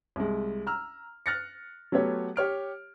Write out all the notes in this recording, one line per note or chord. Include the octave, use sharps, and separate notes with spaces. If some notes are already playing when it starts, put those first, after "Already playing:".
C2 G#3
A#5 E6 F6
F6 F#6 A6 A#6 C#7
F#3 A3 B3 G4 C#5
G4 C#5 F6 D7